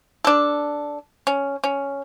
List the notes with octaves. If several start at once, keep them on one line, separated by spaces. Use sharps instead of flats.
D4 A4
C#4
C#4